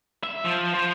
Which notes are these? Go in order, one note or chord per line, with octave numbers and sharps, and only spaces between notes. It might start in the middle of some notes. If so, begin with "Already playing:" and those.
E5
F3
F3